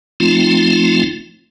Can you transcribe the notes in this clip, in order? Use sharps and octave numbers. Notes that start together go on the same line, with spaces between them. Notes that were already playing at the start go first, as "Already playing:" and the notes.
F3 A3 C4 D#4 F4